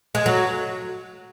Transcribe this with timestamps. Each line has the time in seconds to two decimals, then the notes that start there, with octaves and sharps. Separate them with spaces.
0.15 G#3
0.26 F#3